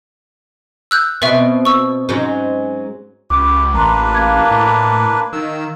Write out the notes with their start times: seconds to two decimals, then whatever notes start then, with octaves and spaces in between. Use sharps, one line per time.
0.91 E6 F#6 G6
1.22 B2 C4 B4 E5
1.65 C#6 E6
2.09 G#2 F#3 C#4
3.30 C#2 G4 B4 D6
3.74 A1 A#3 D4 B4 A#5 C6
4.15 F5 G#6
4.51 A2
5.33 D#3 E6